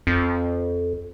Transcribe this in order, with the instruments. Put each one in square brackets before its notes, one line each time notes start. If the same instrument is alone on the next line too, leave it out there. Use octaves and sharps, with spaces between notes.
[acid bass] F2